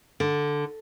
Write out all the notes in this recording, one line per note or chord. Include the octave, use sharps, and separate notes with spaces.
D3